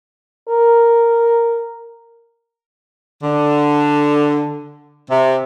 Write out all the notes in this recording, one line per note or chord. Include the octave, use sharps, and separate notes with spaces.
A#4
D3
C3